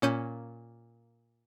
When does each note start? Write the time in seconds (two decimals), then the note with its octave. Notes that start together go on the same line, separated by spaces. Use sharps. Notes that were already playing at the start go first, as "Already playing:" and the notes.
0.02 A#2 C#4 G6 D#7